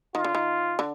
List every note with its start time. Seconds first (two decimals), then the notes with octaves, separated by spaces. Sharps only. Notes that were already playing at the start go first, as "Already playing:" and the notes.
0.15 D#3 F4
0.24 D3
0.35 D#3
0.79 D3